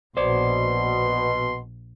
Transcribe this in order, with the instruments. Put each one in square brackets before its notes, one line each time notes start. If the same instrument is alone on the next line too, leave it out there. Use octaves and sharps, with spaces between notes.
[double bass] A#1 [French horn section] B2 [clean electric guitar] C5 D5 [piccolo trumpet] C6